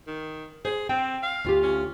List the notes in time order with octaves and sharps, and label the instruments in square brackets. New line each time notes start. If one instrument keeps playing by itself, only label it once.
[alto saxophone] D#3
[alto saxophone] G#4 [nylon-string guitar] C5
[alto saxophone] C4 [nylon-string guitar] G5
[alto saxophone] F5
[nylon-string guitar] D2 F4 G4
[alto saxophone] C#4